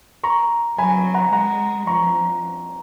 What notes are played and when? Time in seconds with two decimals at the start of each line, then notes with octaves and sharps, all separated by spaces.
0.24 A#5 C#6
0.78 F#3 G#5 B5
1.14 F#5 A#5
1.33 G#3 F#5 A#5
1.87 F3 A#5 C#6